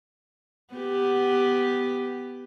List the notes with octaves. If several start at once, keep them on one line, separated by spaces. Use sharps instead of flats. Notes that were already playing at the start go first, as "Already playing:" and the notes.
B3 G4